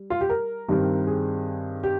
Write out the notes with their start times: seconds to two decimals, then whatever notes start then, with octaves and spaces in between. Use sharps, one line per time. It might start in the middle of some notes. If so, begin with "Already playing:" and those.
Already playing: G3
0.10 F4
0.21 G4
0.30 A#4
0.69 G2 D#3 G3 C4
1.07 G#4
1.83 G4